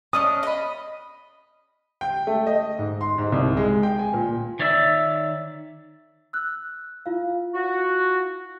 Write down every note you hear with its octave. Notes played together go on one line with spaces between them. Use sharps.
C#4 D4 D#5 D#6
D#5 B5
G5
A3
D#5
G#2
C6
G#2
C2
G#3
G5
G#5
A#2
D#3 C#5 D5 E5 E6
E6 F#6
E4 F4 F5
F#4